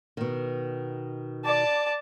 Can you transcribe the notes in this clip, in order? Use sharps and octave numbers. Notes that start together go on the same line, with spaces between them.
B2 D#3
D5 A5